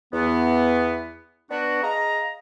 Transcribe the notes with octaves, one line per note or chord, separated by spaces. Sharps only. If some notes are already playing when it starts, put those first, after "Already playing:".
E2 B3
B3 D4 F#4
G#4 D#5 F5 A#5